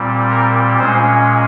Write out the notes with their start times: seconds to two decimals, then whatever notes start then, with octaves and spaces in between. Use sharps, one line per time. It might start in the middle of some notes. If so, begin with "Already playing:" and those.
Already playing: A#2 G3 C4
0.30 A#4
0.79 A#2 G#3 C#4 C5